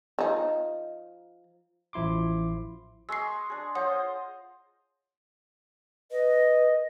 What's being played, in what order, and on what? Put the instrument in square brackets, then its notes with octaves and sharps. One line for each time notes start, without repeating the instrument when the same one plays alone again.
[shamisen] F3 D#4
[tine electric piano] A1 F3 E4 C6 D6
[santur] G#3 D#5 C#6 [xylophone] E6 C7
[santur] D4 G#4
[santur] F4 C5 D#5 [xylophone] C#5 F#5 D#6
[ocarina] B4 [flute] D#5